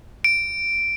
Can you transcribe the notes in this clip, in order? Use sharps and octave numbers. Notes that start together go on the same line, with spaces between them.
D7